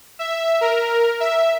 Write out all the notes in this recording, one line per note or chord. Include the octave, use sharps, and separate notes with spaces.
E5
A#4
E5